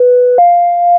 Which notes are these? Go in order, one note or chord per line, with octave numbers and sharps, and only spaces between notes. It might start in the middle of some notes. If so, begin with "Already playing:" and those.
Already playing: B4
F5